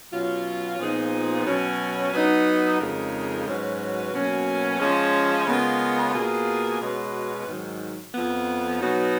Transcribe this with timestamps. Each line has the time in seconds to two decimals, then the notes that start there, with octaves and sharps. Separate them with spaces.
0.12 B2 F#3 C#4 F4
0.79 A#2 F3 B3 D#4 G#4
1.46 B2 F#3 C#4
2.14 F#3 B3 D#4
2.79 F2 C#3 G#3 D#4 A#4
3.47 G#2 F#3 C#4 F#4 B4
4.13 B2 F#3 A#3 C#4
4.80 F3 G#3 C#4
5.47 C#3 G#3 B3 F4 A#4
6.13 B2 A#3 F4 G#4
6.81 B2 G#3 C#4 F#4 B4
7.47 G#2 D#3 F#3
8.13 F2 F3 B3
8.81 B2 F#3 B3 D#4 F#4